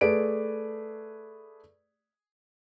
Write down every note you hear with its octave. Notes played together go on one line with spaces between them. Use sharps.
A3 G#4 B4 D5 D7